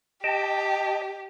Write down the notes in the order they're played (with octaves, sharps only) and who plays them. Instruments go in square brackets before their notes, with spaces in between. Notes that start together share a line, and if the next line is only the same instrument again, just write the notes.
[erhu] G4 [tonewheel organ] D#5 G5 A5